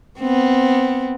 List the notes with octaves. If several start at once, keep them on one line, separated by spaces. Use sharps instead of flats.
B3 C4